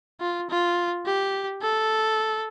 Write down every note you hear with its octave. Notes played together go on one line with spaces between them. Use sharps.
F4
F4
G4
A4